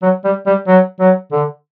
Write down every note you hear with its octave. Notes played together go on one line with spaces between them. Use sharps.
F#3
G3
G3
F#3
F#3
D3